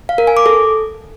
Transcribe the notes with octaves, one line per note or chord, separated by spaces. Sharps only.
F5
A#4
G#5
D6
A4